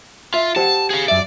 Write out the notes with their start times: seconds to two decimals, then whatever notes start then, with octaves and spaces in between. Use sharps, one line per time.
0.34 F4 E5
0.56 G4 C5 F#5 A5
0.90 G#4 F5
1.08 F#2 D5 E5